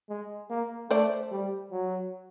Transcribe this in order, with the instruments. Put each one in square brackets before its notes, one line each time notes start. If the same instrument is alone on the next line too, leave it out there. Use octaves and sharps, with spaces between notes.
[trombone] G#3
A#3
[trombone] A3 [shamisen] C5 D5
[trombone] G3
F#3